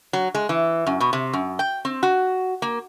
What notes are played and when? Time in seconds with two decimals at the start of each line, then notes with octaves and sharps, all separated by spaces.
0.13 F#3
0.35 G#3
0.49 E3
0.87 F#2
1.00 B2
1.13 C3
1.33 F#2
1.59 G5
1.85 C4
2.03 F#4
2.62 A#3